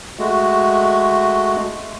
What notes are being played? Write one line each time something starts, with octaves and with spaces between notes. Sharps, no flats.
G#3 A3 F#4